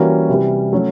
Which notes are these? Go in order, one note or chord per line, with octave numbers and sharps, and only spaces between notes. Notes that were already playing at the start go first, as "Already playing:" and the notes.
Already playing: E3 G3 A#3 C#4 F#4
C3 E3 G3
F#3 A3 C#4 F#4